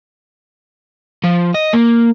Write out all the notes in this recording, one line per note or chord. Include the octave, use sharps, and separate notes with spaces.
F3
D#5
A#3